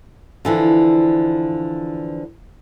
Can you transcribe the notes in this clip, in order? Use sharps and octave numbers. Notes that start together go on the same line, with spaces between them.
D3 E3 F3